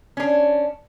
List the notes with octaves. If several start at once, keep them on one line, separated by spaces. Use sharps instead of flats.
C#4 D4